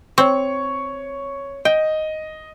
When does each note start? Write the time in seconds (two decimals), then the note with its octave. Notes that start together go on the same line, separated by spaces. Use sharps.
0.18 C4 C#5 C#6
1.65 D#5 G5